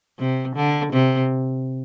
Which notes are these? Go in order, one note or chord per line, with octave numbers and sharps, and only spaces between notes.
C3
D3
C3